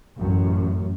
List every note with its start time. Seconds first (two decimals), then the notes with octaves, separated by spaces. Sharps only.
0.18 A1 F#2